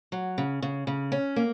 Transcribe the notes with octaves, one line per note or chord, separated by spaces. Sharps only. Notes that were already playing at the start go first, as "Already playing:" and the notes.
F#3
C#3
C#3
C#3
C#4
A#3